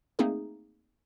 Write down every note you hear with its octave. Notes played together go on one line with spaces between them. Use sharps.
A3 A#3 C4 D#4 G#4